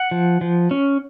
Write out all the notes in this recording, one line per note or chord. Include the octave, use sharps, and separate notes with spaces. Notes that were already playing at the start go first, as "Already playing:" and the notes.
Already playing: F#5
F3
F3
C#4